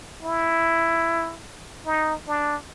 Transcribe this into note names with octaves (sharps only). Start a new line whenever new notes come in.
E4
D#4
D4